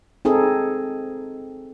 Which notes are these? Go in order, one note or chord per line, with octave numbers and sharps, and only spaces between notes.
C4 D#4 G#4 A4